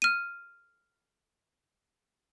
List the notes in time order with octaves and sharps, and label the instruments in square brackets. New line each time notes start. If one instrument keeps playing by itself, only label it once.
[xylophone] F6 D#7